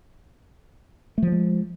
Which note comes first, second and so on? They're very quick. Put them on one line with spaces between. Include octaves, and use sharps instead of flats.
A3 F3 F#3 G#3